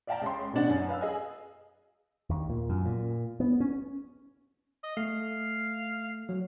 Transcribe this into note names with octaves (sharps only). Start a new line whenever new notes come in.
D5 E5 F5 G5 A5 A#5
C#2 C#4 C6
A1 B2 D4 F#5
F#2
B4 F5 E6
G#4 D#5 G#5
D#2
A#2
F#2
A#2
B3
C#4
D#5
A3 F5
F#3